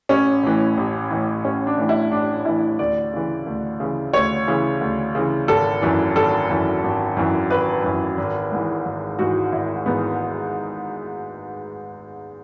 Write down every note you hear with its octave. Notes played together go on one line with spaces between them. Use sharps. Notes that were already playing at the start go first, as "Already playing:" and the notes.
A1 C#4
A2 E3
A1
A2 E3
A1 C#4
D4
A2 E3
E4
A1 D4
A2 E3 E4
D2 D5
C#3 E3
D2
C#3 E3
D2 C#5
C#3 E3
D2
C#3 E3
G#1 A4
F#2 E3
G#1 A4
F#2 E3
G#1
F#2 E3
G#1 B4
F#2 E3
G#1
G#2 E3
G#1
G#2 E3 F#4
G#1 E4
G#2 E3 B3